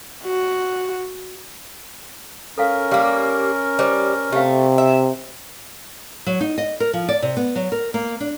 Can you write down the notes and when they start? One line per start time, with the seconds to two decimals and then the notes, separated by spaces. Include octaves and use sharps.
0.24 F#4
2.58 C#4 A4 A#4 F5
2.91 G3 A#3 G4 F5
3.79 G3 C5
4.32 C3 A3 G4 F5
4.78 E5
6.27 F#3
6.41 D#4
6.58 D#5
6.80 A#4
6.93 F3
7.09 D5
7.22 C3
7.37 B3
7.56 F#3
7.72 A#4
7.94 A#3
8.20 D4